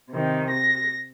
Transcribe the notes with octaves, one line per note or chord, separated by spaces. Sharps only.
C3 D#3
A#6